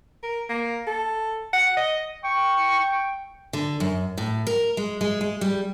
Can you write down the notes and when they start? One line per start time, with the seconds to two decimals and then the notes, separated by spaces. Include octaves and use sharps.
0.23 A#4
0.49 A#3
0.87 A4
1.53 F#5
1.77 D#5
2.24 G5 C#6
3.53 D3
3.80 F#2
4.18 A2
4.47 A#4
4.77 G#3
5.01 G#3
5.21 G#3
5.41 G3